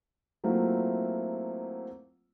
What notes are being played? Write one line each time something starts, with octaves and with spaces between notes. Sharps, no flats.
F#3 A3 A#3 C4 E4 F4